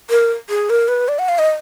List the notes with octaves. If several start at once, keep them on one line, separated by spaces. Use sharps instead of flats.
A#4
G#4
A#4
B4
D5
F#5
F5
D#5